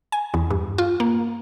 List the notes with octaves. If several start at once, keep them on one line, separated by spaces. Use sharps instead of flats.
G#5
E2
G2
F4
A#3